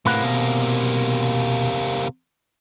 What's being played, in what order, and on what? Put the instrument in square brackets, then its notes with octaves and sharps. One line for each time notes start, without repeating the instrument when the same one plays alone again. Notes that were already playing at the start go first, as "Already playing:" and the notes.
[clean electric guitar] A2 B4 F#5 [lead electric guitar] C3 A#3
[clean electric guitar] B2